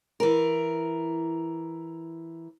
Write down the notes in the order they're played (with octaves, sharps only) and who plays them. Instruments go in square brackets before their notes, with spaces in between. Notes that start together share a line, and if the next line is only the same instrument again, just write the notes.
[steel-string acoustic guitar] E3 A#4